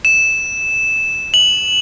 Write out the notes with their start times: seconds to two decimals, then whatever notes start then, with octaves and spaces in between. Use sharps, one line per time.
0.05 E7
1.34 F#7